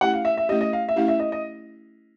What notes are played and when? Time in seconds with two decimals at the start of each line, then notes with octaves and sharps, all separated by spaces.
0.01 A3 C#4 E4 G4 F#5
0.14 F5
0.25 E5
0.37 E5
0.49 A3 C#4 E4 G4 D#5
0.61 D#5
0.73 F5
0.89 E5
0.96 A3 C#4 E4 G4 F5
1.08 E5
1.19 D#5
1.32 D#5